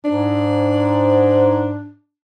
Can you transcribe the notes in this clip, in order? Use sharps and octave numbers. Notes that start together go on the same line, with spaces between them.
G#2 D4